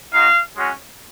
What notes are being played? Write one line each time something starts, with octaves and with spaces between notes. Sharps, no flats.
G#3 D#4 F#4 F5
G#3 C#4 F#4